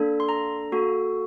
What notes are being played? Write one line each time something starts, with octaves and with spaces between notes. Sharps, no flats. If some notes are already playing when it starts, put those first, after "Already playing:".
Already playing: A#3 D4 A4
C6
A#5
A#3 F#4 A4